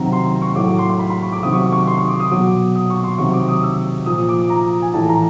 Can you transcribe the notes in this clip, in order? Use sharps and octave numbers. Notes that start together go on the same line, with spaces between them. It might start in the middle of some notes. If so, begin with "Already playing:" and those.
Already playing: C3 D#3 F#3 A#5
C6
C6
C#6
A2 F#3 D6
D6
C6
C6
B5
B5
C#6
D6
C3 D#3 F#3 D#6
C#6
D6
C#6
C6
C#6
D6
D#6
B2 F#3 D6
D#6
C#6
C6
C3 D#3 F#3 C#6
D6
D#6
E6
A#2 F3 D#6
D6
A#5
G#5
A2 E3 A5
A#5